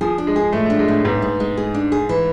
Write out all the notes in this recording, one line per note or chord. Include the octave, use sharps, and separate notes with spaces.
F3 G#4
D4
G#3
G#4
A2 A3
A3
D4
G#3
A2
G#2 B3
G#3
G#3
G#4
D4
G#4
E3